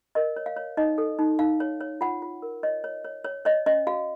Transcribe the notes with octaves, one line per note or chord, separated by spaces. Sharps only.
A#4 D#5
C#5
F5
C#5
D#4 D#5
A4
D#4
D#4 F5
C#5
C#5
F4 F#5
F4
A#4
C#5 D#5
C#5
C#5
C#5
C#5 D#5
C#4 D#5
F#4 F5